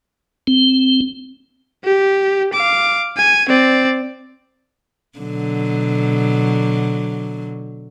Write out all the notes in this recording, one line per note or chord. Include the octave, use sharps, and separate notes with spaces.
C4
G4
F5 D6
G#5
C4 D5
B2 D3 F#3